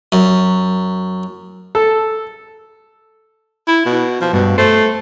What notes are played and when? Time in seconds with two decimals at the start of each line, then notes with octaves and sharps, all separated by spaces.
0.12 F#2
1.75 A4
3.68 E4
3.86 B2
4.21 F3
4.33 G2 B2
4.58 A3 C5